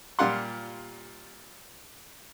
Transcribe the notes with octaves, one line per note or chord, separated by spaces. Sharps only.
A#2 G3 F4 G4 F#5 C6